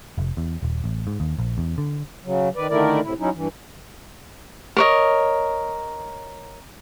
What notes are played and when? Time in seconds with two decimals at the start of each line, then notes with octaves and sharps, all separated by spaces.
0.18 F1
0.37 E2
0.63 D#1
0.84 A1
1.07 G#2
1.20 D#2
1.38 A#1
1.58 E2
1.78 D3
2.25 C#3 F#3
2.56 D#3 B4 D5
2.70 D3 D#3 A3 E4 A#4 D5
3.04 A2 C3 E4
3.20 F#3 C#4 D#4 E4
3.34 G2 E3
4.77 A#4 C#5 D#5